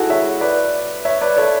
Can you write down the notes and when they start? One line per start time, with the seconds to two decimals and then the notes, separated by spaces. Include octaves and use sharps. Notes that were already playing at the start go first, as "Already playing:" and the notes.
Already playing: E4 F#4 G#4 A4
0.10 C#5 E5
0.41 B4 D5
1.05 C#5 E5
1.21 B4 D5
1.37 A4 C#5